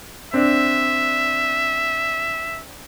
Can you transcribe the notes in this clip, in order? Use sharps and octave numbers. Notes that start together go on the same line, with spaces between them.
C4 D4 E5